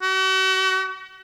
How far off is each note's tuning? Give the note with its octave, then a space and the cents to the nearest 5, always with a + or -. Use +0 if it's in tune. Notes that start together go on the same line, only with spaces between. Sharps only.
F#4 +40